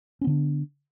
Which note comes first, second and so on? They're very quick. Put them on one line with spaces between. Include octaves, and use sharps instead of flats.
C#4 B3 D3 D4